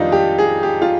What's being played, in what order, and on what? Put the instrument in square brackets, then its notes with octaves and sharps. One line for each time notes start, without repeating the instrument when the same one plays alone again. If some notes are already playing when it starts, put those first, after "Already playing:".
Already playing: [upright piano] F2 D#3 G3 D4 D#4 F4
G4
G#4
G4
F4